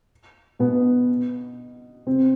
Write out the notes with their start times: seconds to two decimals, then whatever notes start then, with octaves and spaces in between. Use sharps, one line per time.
0.59 B2 B3
2.06 C3 C4